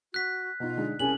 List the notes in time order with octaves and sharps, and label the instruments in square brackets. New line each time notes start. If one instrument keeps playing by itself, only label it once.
[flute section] F#4 [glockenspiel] F#6 B6
[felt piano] B2 D#4 [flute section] F4
[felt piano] D3 G#3 D#4
[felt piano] C2 C#4 G#4 [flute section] A#4 G#5 A5 [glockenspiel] F#7